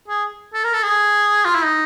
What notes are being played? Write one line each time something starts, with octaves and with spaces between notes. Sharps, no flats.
G#4
A4
A#4
A4
G#4
F4
E4
D#4